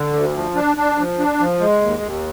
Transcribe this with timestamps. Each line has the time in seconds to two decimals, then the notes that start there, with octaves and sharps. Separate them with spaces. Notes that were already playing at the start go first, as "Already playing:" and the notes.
Already playing: D3
0.13 D2
0.34 F3
0.55 D4
0.77 D4
0.98 F3
1.19 D4
1.40 F3
1.60 G#3
1.82 D#2
2.02 D#2